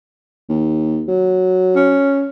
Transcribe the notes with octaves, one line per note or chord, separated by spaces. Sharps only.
D#2
F#3
C#4